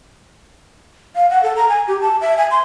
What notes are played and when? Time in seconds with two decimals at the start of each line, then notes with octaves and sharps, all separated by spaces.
1.15 F5
1.30 F#5
1.43 A4
1.56 A#5
1.69 G#5
1.88 G4
2.01 A5
2.21 E5
2.38 G#5
2.51 C6